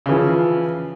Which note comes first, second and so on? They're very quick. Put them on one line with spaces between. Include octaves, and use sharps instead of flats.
C#3 E3 F3